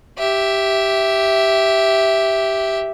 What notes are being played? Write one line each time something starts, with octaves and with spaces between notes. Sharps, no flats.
G4 E5